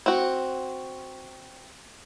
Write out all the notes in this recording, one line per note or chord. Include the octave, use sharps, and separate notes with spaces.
C4 F#4